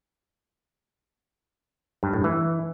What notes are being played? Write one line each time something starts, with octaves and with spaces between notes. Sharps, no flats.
G2
A2
E3